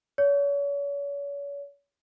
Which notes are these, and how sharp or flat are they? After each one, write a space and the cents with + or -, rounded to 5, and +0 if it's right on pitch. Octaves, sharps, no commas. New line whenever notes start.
C#5 +35